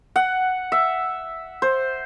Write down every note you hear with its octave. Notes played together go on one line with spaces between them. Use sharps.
F#5
E5
C5